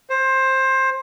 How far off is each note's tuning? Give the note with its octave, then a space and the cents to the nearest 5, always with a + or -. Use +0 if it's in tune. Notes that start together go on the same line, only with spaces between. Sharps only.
C5 +20